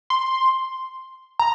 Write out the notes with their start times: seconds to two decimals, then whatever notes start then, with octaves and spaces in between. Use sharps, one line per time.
0.10 C6
1.39 A#5